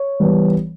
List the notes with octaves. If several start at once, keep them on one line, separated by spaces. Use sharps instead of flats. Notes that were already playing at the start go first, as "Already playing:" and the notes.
Already playing: C#5
E3 G3 B3